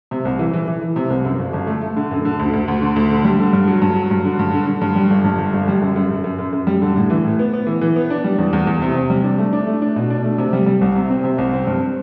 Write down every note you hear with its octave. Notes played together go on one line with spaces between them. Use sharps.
C3
C2
E3
E3
E3
E3
C3
C2
F#2
G1
G1
A3
A3
D3
F#2
D3
D2
D2
D2
D3
D2
D3
G3
D3
G2
F#3
G2
F#3
G2
D3
G2
D3
D3
G2
G3
G1
G2
G1
G1
G3
F#2
F#2
F#2
F#2
F#2
F#2
G3
D3
A2
E3
A2
B3
B3
E3
E3
B3
D4
G3
E2
E2
E2
C3
C3
G3
D4
A3
D4
A3
D4
B2
D4
A3
C3
G3
G3
C2
C3
C4
C3
C2
C4
G2